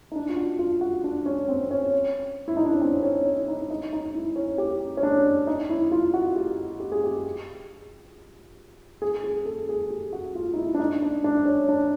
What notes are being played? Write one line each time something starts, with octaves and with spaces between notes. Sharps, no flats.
D#4
D4
F4
F#4
F4
F#4
D4
C#4
C4
C#4
E4
D#4
D4
C#4
C4
C#4
D#4
D#4
D#4
D#4
E4
C#4
G4
C#4
D4
D#4
E4
F4
F#4
G4
G4
G#4
G4
G#4
G#4
A4
G#4
G4
F#4
F4
D#4
E4
D4
D#4
D4
D4
C#4
D4